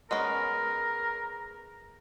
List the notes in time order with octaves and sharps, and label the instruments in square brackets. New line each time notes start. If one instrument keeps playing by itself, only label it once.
[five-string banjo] G#3 B3 C#4 [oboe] A#4